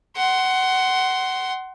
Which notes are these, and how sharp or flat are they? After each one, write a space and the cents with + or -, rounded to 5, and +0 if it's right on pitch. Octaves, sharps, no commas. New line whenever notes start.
F#5 +20 C6 +0